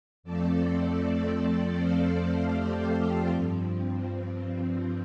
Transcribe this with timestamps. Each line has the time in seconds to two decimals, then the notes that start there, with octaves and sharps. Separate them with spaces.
0.23 F2 F3 A3 C4 A4 D5
1.76 C5 F5
2.14 A4 D5
2.53 G4 C5
2.92 F4 A4
3.30 G2 F3 C4